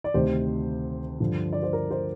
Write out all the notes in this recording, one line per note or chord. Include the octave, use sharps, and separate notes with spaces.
D5
D2 C3 D#3 C5
G2 D3 F3
D5
C5
A#4
C5